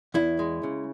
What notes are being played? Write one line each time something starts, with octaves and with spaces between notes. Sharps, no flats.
E2 E4
G#3
C#3